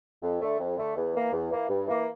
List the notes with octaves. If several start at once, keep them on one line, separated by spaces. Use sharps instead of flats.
F2
D3 A3
F2
D3 A3
E2
E3 A#3
E2
E3 A#3
G2
E3 A#3